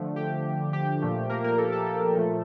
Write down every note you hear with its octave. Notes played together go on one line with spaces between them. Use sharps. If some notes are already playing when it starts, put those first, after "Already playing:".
Already playing: D3 F3 A3
G4
G4
A#2 F3 A3
A#3 A#4
A#3 A#4
A4
A4
A4
A#2 F3 A3